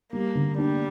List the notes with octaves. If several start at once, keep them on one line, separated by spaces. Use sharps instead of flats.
G3 A#3
D3
G3 D4